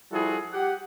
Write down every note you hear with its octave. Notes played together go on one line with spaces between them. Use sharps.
F3 G3 E4 F#4 G#4 A4
G4 F#5